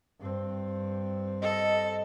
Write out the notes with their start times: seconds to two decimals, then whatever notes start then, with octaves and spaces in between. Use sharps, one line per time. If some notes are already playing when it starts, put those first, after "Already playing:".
0.19 G2 C4
1.42 A4 D#5